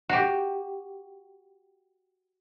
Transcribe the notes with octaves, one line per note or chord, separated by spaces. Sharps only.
F#4 G4